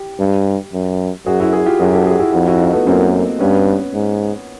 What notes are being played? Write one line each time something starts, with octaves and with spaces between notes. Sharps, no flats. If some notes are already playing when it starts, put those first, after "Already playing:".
Already playing: G4
G2
F#2
F#2 F#4 G#4
E4 F#4
F#4 G#4
F4 G4
F#2 F#4 G#4
G4 A4
F#4 G#4
E4 F#4
F2 E4 F#4
E4 F#4
D#4 F4
A3 B3
F#2 A#3 C4
G2 B3 C#4
G#2